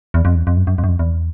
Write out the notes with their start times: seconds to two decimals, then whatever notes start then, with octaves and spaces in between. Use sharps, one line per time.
0.14 E2
0.25 F2
0.35 E2
0.47 F2
0.57 F#2
0.67 F#2
0.78 F2
0.84 F#2
0.89 F2
0.99 E2